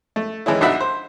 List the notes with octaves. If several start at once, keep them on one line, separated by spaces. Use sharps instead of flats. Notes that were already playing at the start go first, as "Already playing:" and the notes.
A3
D#3 E3 G#3 C#4 E4
A#1 D4 D#4 F#4 E5 B5
C5